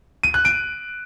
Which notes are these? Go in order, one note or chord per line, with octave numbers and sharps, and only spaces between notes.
D#7
F#6
D7